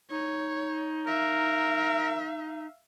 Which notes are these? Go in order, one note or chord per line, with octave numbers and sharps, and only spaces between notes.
D#4 C#5
A#4 E5 F5